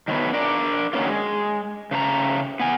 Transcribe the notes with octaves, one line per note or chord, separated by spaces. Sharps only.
D#3 F#3 A3 B3
D4 A#4 D5
D#3 F#3 A#3 C#4 F4
G#3
C#3 A3 B4 A#5
B3 G#5